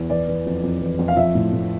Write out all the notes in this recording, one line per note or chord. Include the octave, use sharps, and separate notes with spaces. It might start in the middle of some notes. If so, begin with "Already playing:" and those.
Already playing: E2
E3 D5
E3
F2
F2
E3
F2
F5
F3 E5
A2
A2